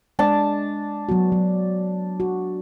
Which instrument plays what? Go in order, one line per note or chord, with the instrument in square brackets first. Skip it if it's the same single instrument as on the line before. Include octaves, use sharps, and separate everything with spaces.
[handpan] G#3 [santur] D4 A5
[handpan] F#3 B3 F#4
F#3
F#4